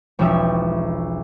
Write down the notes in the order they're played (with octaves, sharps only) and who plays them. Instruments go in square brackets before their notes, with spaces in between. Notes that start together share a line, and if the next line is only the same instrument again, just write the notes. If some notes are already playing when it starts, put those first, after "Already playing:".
[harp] E1 B1 F3 C#4 G4 E5